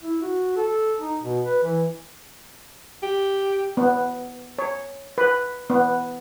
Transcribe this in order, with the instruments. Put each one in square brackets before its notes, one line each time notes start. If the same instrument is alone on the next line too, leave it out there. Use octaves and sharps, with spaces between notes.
[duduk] E4
F#4
A4
D#4
B2
B4
E3
[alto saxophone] G4
[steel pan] B3
C#5
B4
B3